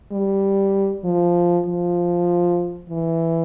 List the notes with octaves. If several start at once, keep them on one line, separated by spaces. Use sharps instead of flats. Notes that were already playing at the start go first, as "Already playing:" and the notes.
G3
F3
F3
E3